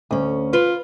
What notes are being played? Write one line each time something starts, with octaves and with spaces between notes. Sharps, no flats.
D2 C#4
F4 B4